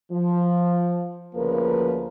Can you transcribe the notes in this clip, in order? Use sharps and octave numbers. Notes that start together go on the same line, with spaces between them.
F3
D2 C#3 F3 A#3 A#4 B4